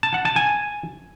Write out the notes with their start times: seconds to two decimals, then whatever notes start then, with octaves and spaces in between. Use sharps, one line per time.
0.03 A5
0.14 F#5
0.25 A5
0.36 G#5